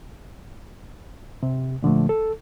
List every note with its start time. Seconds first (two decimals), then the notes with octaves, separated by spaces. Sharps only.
1.43 C3
1.83 A#2 D3 F3 A3
2.09 A4